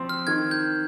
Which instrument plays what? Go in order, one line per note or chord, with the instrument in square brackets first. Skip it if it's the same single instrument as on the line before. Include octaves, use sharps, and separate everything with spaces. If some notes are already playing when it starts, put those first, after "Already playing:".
Already playing: [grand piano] F3 C4
[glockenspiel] F6
[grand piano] D#3 [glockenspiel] G#6
[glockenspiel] G6